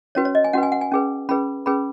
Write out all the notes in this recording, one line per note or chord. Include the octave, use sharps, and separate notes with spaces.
C#4 F#4 B4 C#5
C#5
D#5
G#5
C#4 F#4 B4 F#5
G#5
F#5
G#5
C#4 G#4 B4
C#4 G#4 B4 B5
C#4 G#4 B4 B5